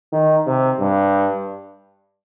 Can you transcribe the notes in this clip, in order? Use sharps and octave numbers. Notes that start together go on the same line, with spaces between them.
D#3
C3
G2